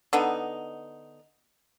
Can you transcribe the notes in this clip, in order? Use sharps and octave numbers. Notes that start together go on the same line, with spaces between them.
D3 B3 D#4